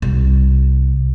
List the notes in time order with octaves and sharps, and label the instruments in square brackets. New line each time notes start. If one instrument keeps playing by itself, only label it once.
[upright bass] C2